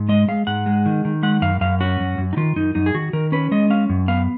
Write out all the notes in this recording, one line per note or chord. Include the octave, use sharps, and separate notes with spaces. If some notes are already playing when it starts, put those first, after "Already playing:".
Already playing: G#2
G#3 D#5
G#3 F5
G#2 F#5
G#3
D#3
D#3
G#3 F#5
F#2 F5
F#2 F5
C#4 F#4
F#2
F#2
D#4
D#3 F4
F#2 D#4
F#2 D#4
G#4
D#3 F#4
D#3 A#4
C#4 B4
G#3 D#5
C#4 F5
F#2
B3 F5